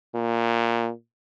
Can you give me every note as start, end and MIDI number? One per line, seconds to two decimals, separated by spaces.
0.15 0.91 46